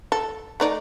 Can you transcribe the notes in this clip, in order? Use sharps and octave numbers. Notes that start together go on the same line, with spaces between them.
A4
A3 D#4 D5